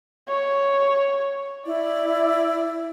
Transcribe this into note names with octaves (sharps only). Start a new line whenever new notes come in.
C#5
E4 D5